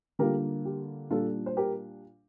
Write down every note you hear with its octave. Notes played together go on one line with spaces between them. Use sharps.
D3 G3 A#3 F4 G4 A#4
G4
A#2 G3 D4 F4 A4
C5
G4 A#4